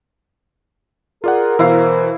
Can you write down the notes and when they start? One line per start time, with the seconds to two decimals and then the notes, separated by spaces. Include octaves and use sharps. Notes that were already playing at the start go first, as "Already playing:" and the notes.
1.24 F4 G#4 A#4 D5 F#5
1.59 B2 E3 E4 C5 F5